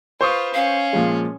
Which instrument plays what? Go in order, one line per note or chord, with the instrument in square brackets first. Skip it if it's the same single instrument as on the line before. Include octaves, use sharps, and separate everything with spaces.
[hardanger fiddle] F4 B4 [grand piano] C5 C#6 D#6
[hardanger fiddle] C#4 [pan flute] F5
[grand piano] A#2 F3 G#3